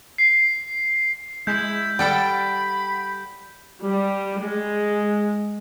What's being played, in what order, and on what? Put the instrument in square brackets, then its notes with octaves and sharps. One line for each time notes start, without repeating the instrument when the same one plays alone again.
[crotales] C7
[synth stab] G#3 [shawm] E4 [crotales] G6
[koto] G3 A4 G5 [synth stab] F#5 D7 [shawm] B5
[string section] G3
G#3